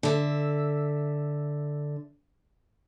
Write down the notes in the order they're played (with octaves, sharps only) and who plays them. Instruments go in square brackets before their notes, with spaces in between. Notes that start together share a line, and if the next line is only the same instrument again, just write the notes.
[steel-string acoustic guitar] D3 E5